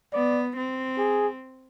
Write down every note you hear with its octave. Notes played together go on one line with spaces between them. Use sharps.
B3 D5
C4
G#4